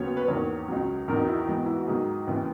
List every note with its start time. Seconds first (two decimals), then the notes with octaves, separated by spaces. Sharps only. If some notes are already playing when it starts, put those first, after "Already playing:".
Already playing: D#2 C#3 F#3 B3 C#5
0.17 B4
0.28 E2 D#3 A#3 C#5
0.68 C#2 C#3 F#3
1.08 E2 D#3 F#3 A#4
1.18 D#4
1.28 E4
1.38 F#4
1.48 G#2 E3 B3
1.66 E4
1.76 F#4
1.87 G#2 D#3 F#3 G#4
2.28 D#2 C#3 E3